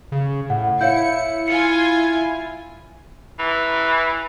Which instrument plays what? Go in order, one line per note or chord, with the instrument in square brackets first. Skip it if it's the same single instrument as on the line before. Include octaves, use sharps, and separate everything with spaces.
[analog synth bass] C#3
[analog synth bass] A2 [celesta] F#5
[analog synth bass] E4 [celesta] C#5 F5 G6 [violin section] C#7
[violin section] F4 G#5 [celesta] C#7
[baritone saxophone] E3